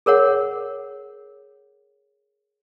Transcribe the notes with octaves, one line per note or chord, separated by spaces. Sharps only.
G#4 A#4 C#5 F#5